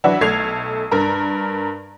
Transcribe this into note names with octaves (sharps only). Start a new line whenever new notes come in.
E3 F#3 D4 E4 F#4
B1 A3 G#6 C7 F7
G2 A#4 A#5